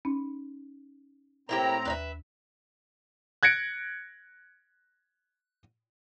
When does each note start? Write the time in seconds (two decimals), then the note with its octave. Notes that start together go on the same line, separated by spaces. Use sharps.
0.05 C#4 D#4 B5
1.49 A2 A#3 C4 E4 G4 A#5
1.85 D#2 B4 D5 E5
3.43 F#6 G#6 A#6 C#7 D7